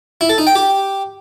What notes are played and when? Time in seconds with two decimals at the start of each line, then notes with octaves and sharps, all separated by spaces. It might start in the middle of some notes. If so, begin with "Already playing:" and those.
0.21 E4
0.30 A4
0.38 D#4
0.47 G5
0.55 G4